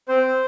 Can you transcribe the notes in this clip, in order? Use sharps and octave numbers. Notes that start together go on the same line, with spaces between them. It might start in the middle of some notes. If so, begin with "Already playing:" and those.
C4 C5